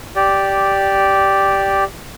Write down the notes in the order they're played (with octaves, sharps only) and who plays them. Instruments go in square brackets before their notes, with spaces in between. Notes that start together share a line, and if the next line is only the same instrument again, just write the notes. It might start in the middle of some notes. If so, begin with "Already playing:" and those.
[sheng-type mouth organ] G4 D5